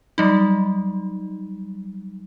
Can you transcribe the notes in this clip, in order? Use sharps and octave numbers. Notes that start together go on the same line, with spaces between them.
F#3 G3 D#4